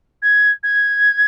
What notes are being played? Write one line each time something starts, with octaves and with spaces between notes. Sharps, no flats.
G#6
G#6